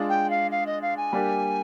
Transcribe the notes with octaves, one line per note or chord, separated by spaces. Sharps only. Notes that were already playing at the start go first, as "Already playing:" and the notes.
Already playing: G#3 D4 F4 G#4
G5
F5
F5
D#5
F5
G#5
G3 A#3 D4 G4